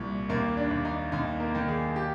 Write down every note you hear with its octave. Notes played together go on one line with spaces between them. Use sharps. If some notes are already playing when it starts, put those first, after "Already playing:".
Already playing: C2 A#2
D#2 A#3
D4
D#2
D#4
D#2 D#4
A#3
D#3
G#4
G4